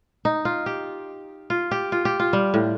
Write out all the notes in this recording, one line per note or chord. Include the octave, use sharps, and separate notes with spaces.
D#4
F4
G4
F4
G4
F4
G4
F4
G3
A2